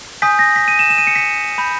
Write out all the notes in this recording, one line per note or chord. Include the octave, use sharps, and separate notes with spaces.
G#5 D#6 G6 B6
A#6
B6
D#7
E7
E7
D#7
C#7
B6
B5 G6